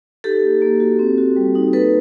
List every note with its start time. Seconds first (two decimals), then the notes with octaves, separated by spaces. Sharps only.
0.24 D#4 G4 A4
0.43 A#3
0.62 A#3
0.80 F#4
0.99 C4
1.18 F#4
1.36 G3
1.55 D#4
1.73 A#3 A4 B4